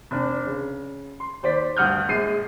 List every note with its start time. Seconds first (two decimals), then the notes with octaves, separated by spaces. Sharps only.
0.11 F1 D4
0.47 C#3
1.20 C6
1.43 D#2 C5 D5 B6
1.77 D2 G2 F#5 D#6 F6 G6
2.09 A#1 G#3 C7 D#7